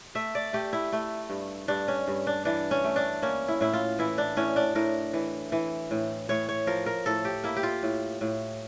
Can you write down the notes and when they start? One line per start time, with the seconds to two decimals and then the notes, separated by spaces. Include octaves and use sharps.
0.15 A3 E5
0.35 D5
0.53 A3 G4
0.73 E4
0.92 A3
1.30 G2
1.68 G2 D4
1.88 C#4
2.08 G2
2.27 D4
2.45 E3 D4
2.71 C#4
2.84 A3
2.96 D4
3.22 A#3 C#4
3.48 E4
3.61 A2 E4
3.74 F4
3.99 E3 E4
4.18 D4
4.37 A2 C#4
4.56 D4
4.75 A2 A#4
5.13 E3
5.52 E3
5.91 A2
6.29 A2 C#5
6.49 C#5
6.67 F3 A#4
6.86 A#4
7.06 A2 A4
7.25 G4
7.44 A#3 E4
7.56 G4
7.63 F4
7.83 A2
8.21 A2